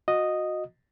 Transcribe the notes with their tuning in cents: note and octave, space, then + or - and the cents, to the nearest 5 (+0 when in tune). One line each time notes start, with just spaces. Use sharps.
F#4 -25 D#5 -5